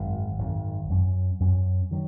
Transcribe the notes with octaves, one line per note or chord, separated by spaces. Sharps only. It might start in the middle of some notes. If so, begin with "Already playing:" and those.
Already playing: G#1 F#2 D#3
G#1 F#2 D#3
F#2 F#3 C#4
F#2 F#3 C#4
D#3 F#3